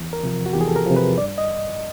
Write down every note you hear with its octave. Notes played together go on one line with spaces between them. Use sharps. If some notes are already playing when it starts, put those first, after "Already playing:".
Already playing: E2
A#4
C3 F3
F#4
E2 G4
G#4
A4
A#4
C3 F3
B4
G2 D5
D#5